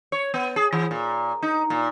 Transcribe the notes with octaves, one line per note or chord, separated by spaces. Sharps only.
C#5
B3
G#4
E3
A#2
D#4
A#2